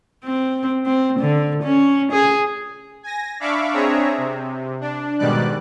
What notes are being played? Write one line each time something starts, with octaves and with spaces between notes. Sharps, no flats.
C4
C4
D3
C#4
G#4
G#5 A#6
D4 E5 F5 B5 C#6 D6
C4 D4 G#4 C#5 E5 A#5
C3
D4
G#2 B2 D#3 G3 D5 F#6